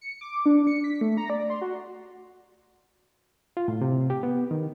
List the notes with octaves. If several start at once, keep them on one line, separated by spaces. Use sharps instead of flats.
C#7
D6
D4
C#7
B6
A3
A#5
D5
C6
F#4
F4
A2
C3
G4
B3
D#3